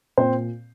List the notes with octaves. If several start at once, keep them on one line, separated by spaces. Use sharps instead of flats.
A#2 C4 C5